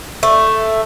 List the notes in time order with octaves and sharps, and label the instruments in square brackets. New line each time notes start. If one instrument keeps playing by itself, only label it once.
[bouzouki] A3